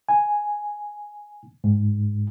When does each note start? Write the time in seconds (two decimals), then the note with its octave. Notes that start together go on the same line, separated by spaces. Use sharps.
0.09 G#5
1.64 G#2